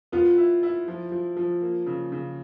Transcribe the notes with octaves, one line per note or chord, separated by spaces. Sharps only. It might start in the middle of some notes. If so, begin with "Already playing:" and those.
B3 F4
E4
E4
F3
F3
F3
A#3
C#3
C#3